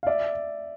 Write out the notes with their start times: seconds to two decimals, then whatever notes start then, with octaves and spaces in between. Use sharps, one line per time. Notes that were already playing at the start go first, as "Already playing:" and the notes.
0.03 F5
0.06 D5 E5